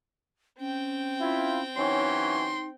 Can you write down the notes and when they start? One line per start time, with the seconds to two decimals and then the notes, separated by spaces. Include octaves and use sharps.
0.60 C4 C#4 G5
1.21 E4 F4
1.76 E3 F#3 C#4 D#4 C6